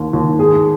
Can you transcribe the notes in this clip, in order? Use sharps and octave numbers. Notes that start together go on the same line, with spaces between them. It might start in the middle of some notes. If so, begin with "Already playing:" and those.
Already playing: D#2
D#2
G#2 G#4